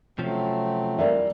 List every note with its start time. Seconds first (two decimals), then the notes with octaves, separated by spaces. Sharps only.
0.19 C3 F3 F#3 A3 C4 C#4
0.99 E3 G3 A#3 A#4 D5 E5